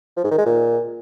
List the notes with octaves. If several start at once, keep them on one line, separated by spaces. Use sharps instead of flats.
F3
G#2
D#3
G#3
A#2